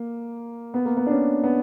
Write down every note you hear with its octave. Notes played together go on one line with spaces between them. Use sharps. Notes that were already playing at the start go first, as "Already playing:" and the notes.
Already playing: A#3
B3
A#3
B3
D4
C#4
B3